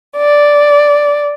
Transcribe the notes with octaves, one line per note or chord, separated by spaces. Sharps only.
D5